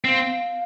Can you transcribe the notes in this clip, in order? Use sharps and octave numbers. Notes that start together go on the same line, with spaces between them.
C4 F5